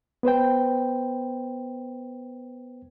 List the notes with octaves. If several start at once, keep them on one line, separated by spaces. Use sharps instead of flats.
B3 B4 C5 G5